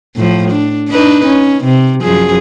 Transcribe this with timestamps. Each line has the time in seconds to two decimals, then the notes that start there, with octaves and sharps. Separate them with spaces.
0.17 A2 F3
0.51 D4
0.89 D4 D#4 B4
1.26 C#4
1.64 C3
2.02 F#2 F3 G#4